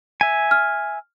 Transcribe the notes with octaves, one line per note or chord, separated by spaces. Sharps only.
E5 G#5
F6